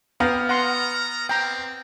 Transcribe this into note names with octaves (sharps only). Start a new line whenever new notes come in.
B3 F5 G5 A#5 F6
F#5 A#5 C6
C4 G5 A#5